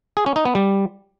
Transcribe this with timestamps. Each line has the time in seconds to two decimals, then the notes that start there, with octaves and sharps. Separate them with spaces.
0.17 G#4
0.26 C#4
0.36 D#4
0.45 B3
0.55 G3